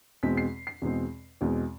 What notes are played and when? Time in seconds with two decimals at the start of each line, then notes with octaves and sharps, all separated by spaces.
0.23 E2 B2 G#3 C4 B6
0.37 C7
0.67 C7
0.82 E2 B2 G#3 C4
1.41 E2 B2 G#3 C4